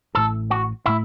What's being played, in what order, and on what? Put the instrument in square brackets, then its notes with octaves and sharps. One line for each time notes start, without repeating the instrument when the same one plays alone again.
[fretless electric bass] A1 A2 A3 [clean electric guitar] A4
[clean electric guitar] F#4
[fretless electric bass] A2 A3 [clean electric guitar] E4